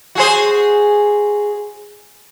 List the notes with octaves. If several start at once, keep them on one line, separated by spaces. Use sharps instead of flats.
F#4 G#4 C5